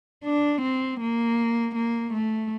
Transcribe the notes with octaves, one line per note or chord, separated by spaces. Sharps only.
D4
C4
A#3
A#3
A3